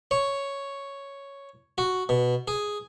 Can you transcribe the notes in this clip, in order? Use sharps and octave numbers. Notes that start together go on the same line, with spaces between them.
C#5
F#4
B2
G#4